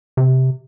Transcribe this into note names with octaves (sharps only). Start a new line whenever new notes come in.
C3